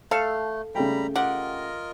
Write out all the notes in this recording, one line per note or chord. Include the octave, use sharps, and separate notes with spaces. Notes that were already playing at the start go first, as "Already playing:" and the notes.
A3 A4 F5
C#3 G3 A3 G5 A#5 B5
F4 G4 A#4 D#5 F#5